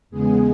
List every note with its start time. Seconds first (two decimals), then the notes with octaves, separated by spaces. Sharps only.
0.10 E2 C#3 G#3 B3 G#4